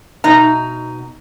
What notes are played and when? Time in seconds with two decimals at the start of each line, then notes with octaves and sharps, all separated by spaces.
0.24 B2 D#4 A#5